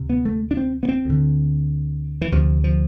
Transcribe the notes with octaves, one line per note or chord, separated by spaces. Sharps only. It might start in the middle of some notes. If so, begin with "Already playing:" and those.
Already playing: D2 C3
B3
A3
D4
C4
B3
C4
D2 D3
E3
D2 C3 F3
F3